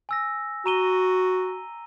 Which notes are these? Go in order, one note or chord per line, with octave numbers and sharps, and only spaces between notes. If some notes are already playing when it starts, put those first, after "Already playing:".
G#5 E6 A#6
F#4 A#5 D#7 G7